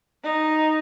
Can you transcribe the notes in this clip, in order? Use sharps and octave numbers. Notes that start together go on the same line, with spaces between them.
D#4